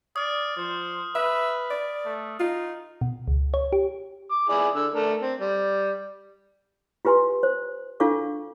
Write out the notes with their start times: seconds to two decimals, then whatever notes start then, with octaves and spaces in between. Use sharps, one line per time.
0.16 D5 D#6 F6
0.57 F3 C5
1.15 B4 E5
1.71 D5
2.05 A3
2.40 D#4 F4
3.01 B2
3.28 C#2
3.54 C#5
3.73 G4
4.31 D6
4.49 E4 G#4 D5
4.75 D3 E6
4.94 A3 D4 A#4
5.22 C4
5.41 G3
7.05 F4 G4 B4 G#5 C6
7.43 C5
8.00 D4 F4 A4 F5 C#6 D6